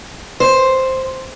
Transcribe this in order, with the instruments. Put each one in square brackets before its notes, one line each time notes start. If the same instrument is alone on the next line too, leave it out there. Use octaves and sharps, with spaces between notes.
[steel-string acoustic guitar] C5